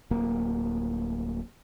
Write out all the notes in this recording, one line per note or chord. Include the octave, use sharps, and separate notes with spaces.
D1 A#3